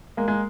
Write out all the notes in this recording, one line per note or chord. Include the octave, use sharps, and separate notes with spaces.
G#3 A#3
G#3 A#3